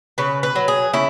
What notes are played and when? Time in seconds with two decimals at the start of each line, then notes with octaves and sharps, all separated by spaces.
0.18 C#3 B4
0.43 B4
0.56 F#3
0.68 G#4
0.93 C#3 E4